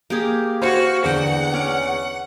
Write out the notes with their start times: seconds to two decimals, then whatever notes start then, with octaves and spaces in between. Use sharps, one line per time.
0.10 A#3 G4 G#4
0.62 F#4 C5 F5 F#5 G#5
1.04 E2 D3 F#5 G5
1.54 C#4 D6